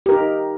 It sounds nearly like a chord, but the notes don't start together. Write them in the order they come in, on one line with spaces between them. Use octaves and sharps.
G4 A#4 D#4